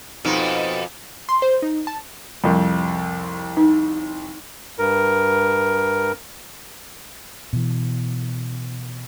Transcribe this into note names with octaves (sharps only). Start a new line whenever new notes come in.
F2 B2 D#4
C6
C5
D#4
A5
C2 F2
D#4
G2 A#4
B2 E3